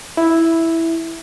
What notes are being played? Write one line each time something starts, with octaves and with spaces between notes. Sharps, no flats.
E4